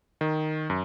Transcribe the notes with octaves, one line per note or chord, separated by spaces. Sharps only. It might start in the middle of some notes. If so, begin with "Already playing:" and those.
D#3
F#2